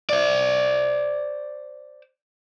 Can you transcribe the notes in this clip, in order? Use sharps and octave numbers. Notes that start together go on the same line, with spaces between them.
C5 D5